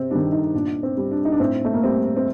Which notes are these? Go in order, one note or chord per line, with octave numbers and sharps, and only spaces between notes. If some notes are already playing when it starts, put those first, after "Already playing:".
Already playing: C3 C4
D#3 G3 D4
D#4
A#2 D4
C4
G3
D4
D#4
D4
A2 C4
A3
A#3
G3 C4
C4